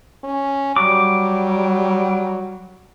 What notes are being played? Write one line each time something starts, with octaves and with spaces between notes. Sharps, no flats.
C#4
F#3 G3 D6